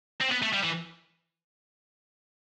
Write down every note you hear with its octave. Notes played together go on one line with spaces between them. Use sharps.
C4
B3
A3
G3
E3